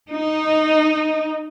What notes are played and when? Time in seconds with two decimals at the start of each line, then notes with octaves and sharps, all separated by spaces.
0.11 D#4